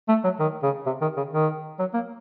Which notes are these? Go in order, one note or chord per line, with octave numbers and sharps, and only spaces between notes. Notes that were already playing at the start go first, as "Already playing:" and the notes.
A3
F#3
D#3
C#3
C3
D#3
C#3
D#3
F#3
A#3